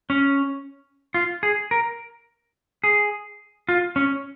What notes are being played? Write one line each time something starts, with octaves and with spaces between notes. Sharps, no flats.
C#4
F4
G#4
A#4
G#4
F4
C#4